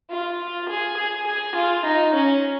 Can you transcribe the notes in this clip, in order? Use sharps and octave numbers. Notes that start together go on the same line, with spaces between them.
F4
G#4
G#4
G#4
F4
D#4
C#4